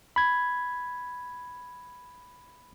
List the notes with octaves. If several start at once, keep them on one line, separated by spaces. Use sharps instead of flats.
B5 G#6